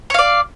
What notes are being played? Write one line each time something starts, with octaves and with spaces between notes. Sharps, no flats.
C#5 D5 F5